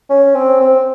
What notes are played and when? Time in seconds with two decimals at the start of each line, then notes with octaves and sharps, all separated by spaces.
0.10 C#4
0.35 C4
0.60 C4